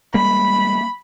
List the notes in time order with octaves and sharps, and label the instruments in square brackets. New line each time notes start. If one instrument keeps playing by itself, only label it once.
[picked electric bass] G3 G#3 A#3 [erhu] B5